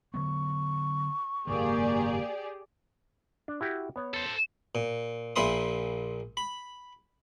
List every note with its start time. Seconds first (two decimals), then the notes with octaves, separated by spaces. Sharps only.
0.14 D3 F#3 B3 C#6
1.47 F#1 G#2 D#3 A#3 G4 G#4 D5
3.48 D4
3.61 E4 F#4 G4
3.96 B3 C#5
4.14 A4 C5
4.75 A#2
5.36 A#1 A#2 E5 B5 C6 D#6
6.37 B5